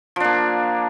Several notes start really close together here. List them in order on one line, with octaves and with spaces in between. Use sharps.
F3 D4 A#3